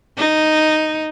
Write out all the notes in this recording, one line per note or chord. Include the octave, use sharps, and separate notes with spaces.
D#4